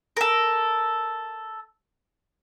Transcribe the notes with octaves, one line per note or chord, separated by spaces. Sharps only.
A4 A#4